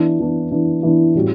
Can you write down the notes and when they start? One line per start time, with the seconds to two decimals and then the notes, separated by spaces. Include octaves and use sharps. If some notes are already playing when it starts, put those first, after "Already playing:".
Already playing: E3 B3 D4
0.19 E3 B3 D4
0.51 E3 B3 D4
0.83 E3 B3 D4
1.15 A2 G3 C#4 F#4